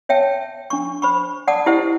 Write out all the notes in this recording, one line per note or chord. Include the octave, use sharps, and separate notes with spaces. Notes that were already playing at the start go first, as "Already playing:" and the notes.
C#5 E5 G5 A5
D4 C#6
C5 B5 C#6
D5 F#5 A5 D6 D#6
E4 G4 C5 D#5 F#5